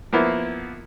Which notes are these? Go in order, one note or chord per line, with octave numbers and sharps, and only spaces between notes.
F3 A#3 B3 E4